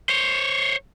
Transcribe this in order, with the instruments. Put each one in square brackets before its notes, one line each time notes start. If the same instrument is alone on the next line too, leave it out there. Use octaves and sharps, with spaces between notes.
[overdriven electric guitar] C5 C#5